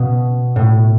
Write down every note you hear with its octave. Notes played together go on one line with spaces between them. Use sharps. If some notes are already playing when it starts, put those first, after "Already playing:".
Already playing: B2
A2